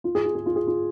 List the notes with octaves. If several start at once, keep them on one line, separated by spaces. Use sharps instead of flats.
F4
G#4
F4
G#4
F4
G#4
F4